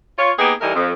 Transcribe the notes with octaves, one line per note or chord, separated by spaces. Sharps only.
F4 C#5
A#3 B3 D#4 G4 G#4
E3 G3 A3 D#4 A#4
F2